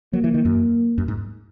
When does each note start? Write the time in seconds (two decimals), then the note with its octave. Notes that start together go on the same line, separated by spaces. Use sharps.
0.13 F#3 A#3
0.24 E3
0.34 D#3
0.45 F#2
0.98 F#2
1.08 G#2